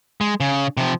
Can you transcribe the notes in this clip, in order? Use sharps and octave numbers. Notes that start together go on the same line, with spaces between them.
G#3
C#3
C3 F3